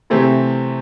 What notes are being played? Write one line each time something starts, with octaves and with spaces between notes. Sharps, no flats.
C3 E3 A3 C4 G4